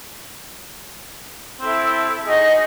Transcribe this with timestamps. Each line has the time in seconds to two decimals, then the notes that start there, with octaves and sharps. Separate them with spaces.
1.61 C4 E4 A4
2.25 D#4 F#4 G#4 D#5